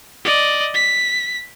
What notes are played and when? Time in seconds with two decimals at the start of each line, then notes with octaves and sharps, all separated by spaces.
0.25 D5 D#5
0.74 B6